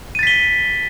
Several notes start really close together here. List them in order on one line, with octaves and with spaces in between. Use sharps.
D#7 A6 B6 G7